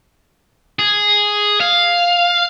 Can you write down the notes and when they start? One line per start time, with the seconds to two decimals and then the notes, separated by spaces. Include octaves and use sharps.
0.79 G#4
1.61 F5